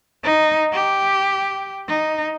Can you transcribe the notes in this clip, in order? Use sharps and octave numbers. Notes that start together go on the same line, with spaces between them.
D#4
G4
D#4